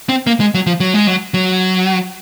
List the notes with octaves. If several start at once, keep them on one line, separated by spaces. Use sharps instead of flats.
C4
A#3
G#3
F#3
F3
F#3
G#3
F#3
F#3